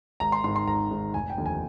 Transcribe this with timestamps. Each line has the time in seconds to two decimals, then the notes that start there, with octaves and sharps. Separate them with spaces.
0.20 G#1 A#5
0.32 C6
0.44 G#2 C6
0.48 D#3
0.56 C6
0.67 G#1 A#5
0.91 G#2 D#3
1.14 F1 G#5
1.30 G5
1.38 D#2 D3 F3
1.46 G#5